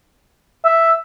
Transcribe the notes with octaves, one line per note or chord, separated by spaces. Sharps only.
E5